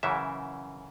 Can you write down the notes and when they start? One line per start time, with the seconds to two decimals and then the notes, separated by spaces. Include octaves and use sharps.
0.03 F#2 C#3 E3 E5